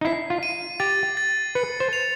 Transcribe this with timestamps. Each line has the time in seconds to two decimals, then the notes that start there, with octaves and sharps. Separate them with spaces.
0.01 D#4
0.05 E4 C7
0.30 F4
0.43 D#7
0.80 G4 A6
1.17 A6
1.55 B4 C#7
1.80 C5
1.93 F7